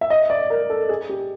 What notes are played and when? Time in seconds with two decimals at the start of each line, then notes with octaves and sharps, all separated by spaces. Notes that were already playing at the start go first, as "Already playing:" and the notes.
0.01 E5
0.10 D#5
0.30 D5
0.50 A#4
0.70 A4
0.89 G#4
1.09 G4